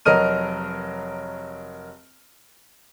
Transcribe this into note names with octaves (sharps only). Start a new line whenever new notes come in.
F1 F#3 A#4 D#5 F6 D#7